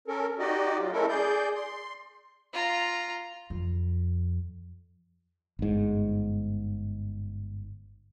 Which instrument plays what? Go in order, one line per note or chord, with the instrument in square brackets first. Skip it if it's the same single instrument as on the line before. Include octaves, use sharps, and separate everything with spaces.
[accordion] C#4 A4 A#4
D#4 F#4 G4 D5 D#5
F#3 F4
G#3 A3 C#4 E4 A4 A#4
G#4 D5 G6
C6
[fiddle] F4 A#5
[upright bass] F2
[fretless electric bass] G1 G#2